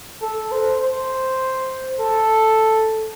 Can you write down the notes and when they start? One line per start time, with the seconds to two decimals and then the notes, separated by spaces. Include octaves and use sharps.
0.22 A4
0.52 C5
0.82 C5
2.00 A4